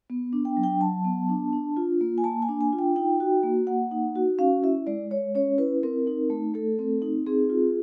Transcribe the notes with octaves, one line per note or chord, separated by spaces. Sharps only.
B3
D4
G5
F#3
G5
F#3 A5
B3
D4
D4
F4
A#3
G#5
A#3 A5
G#5
D4
G#5
F4
G5
D#4 G5
F#4
A#3
A#3 F#5
D#4
F#4
C#4 F5
E4 E5
G#3 D5
G#3 C#5
C#4 C#5
E4 B4
C4 A#4
D#4
A3
A3 A4
C4
D#4
C4 G#4
F4